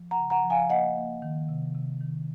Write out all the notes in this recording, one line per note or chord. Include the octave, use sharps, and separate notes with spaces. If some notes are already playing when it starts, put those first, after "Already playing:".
Already playing: F3
F#5 A#5
C#3
F#5 A#5
F3
F5 G#5
A#3 D#5 F#5
A#3
D#3
C3
C3
D#3